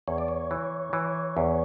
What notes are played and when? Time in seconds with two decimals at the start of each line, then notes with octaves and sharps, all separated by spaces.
0.08 E2 C#5
0.18 D5
0.28 C#5
0.51 E3
0.93 E3
1.37 E2